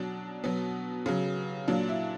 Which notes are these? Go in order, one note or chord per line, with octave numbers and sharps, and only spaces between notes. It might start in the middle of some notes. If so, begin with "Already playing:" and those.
Already playing: B2 F#3 D4
B2 F#3 B3
C#3 F#3
A#2 F#3 D4
E4